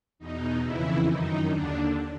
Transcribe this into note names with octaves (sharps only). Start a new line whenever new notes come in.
E2 B2 D#4
F2 C#3 E3 E4
F#2 D#3 D#4
D#2 D3 D4